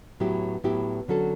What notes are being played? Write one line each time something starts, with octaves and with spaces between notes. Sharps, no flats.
A2 F#3 B3 E4 G4
A2 F#3 B3 E4 G4
D3 F#3 C#4 F#4 A4